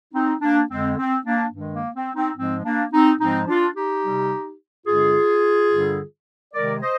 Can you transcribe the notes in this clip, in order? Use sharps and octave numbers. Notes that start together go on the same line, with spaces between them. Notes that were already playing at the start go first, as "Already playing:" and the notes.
C4 D#4
A#3 D4
F2 D3 G#3 C4
C4
A#3 D4
G2 D#3 G#3
A#3
C4
C4 D#4
G#2 F3 G#3 C4
A#3 D4
C4 D#4
G#2 F3 G#3 C4 D#4
D4 F4
D#4 G4
C3 G3
G2 D3 G#3 F4 G#4
G2 D3 G3
C3 D#3 G#3 A#4 D5
C5 D#5